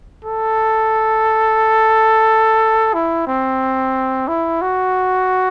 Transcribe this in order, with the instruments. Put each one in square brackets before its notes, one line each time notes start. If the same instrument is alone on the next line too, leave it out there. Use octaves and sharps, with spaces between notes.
[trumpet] A4
E4
C4
E4
F#4